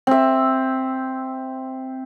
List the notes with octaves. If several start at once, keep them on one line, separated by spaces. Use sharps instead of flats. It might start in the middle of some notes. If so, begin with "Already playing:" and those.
C4 E5